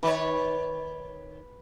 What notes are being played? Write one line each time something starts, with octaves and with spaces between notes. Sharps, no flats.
D#3 B4 C#5